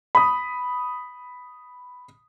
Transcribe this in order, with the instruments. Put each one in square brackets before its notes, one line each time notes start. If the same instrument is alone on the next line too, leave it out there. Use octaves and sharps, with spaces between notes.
[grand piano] B5 D#6